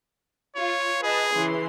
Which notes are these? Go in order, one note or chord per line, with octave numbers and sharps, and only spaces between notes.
F4 C#5
G#4 B4 D#5 A5
C#3 E3 C6